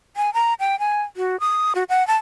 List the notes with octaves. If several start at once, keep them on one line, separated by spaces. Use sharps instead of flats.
G#5
A#5
G5
G#5
F#4
D#6
F#4
F#5
A5